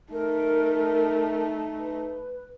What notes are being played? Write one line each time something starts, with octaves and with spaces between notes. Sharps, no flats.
A3 D#4 A#4
B4